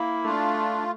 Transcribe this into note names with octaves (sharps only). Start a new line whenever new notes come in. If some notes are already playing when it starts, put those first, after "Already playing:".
Already playing: A#3 E4
A3 D4 F4